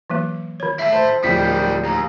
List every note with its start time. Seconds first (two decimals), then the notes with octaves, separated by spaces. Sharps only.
0.10 E3 F#3 A#3
0.60 D#3 C#5
0.79 E4 A4 E5
0.93 C5 A5
1.24 D1 D#3 F3 G3 G5 B6
1.84 D#2 A#5